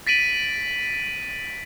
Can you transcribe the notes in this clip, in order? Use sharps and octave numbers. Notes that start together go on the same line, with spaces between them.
A6 B6 D7 D#7 F#7